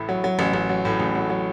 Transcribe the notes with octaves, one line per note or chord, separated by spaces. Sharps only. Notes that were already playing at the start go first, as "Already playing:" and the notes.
Already playing: A1 A2 E4
F#3
F#3
A1
A1
F#3
A2
A1
F#3
F#3